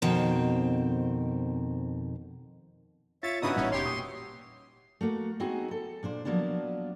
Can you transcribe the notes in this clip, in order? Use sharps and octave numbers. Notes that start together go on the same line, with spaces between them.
F2 B2 D#3 C4
F4 C#5 E5 A6
G2 C#3 B3 D#4 E4 F#4 B5 D#6
A1 A#2 G3 C#4
F1 G4 C#5 C6
A#2 C#6 D#6
A3 A#3 F#4
G#3 B3 C4 D#4 F#4 G#4
A4
A#2 D4 C5
F3 F#3 A#3 B3 D4